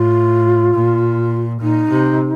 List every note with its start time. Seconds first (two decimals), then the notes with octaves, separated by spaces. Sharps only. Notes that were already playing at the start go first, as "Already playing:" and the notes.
Already playing: A2 F4
0.74 A#2
1.60 A#2 D#4
1.89 C3